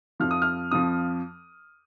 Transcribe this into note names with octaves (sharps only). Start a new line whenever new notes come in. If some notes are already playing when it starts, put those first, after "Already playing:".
F2 F3 F6
D#6
F6
F2 F3 D#6